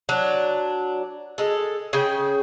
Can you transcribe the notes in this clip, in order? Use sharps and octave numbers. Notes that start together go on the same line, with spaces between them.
F#3 D4
G#3 A4
C#3 G#4 G5